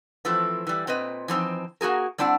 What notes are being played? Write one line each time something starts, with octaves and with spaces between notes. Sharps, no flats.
E3 F3 A3 C4 E4
E3 G3
A#2 C4 B4 D#5
E3 F3 C4 D#4
A#3 F#4 G#4 A#4
G3 C4 D4 E4 F#5